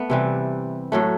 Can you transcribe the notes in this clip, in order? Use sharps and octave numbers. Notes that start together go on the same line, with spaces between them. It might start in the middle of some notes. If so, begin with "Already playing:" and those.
Already playing: A3 B3
C3 E3 G3
A2 F#3 A3